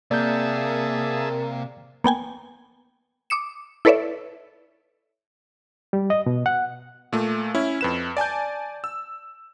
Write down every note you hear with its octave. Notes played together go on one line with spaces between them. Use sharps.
C3 A#3 G#4 D5 E5 A5 G6
A#3 B3 G5 G#5
D6 D#6 C#7 E7
E4 A4 B4 C#5 D5 E5
G3
D#5
B2
F#5
A#2 A3
C#4 E4
F2 B4 E7
D5 G#5 A5 G6
E6